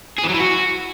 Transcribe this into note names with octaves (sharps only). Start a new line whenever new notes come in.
G#4
E3
F#3
E3
F#4